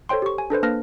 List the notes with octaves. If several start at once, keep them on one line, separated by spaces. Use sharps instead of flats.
A4 C5 C#5 G5 C6
G4 C#6
G#5
D4 A4 B4 C5
A#3 D4 B4 A5 F6 A#6